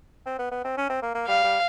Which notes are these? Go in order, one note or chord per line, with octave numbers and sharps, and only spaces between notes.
C4
B3
B3
C4
C#4
C4
A#3
A#3
G3 F5
G3